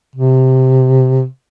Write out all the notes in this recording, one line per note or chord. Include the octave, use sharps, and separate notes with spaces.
C3